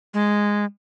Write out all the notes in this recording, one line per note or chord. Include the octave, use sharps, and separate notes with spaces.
G#3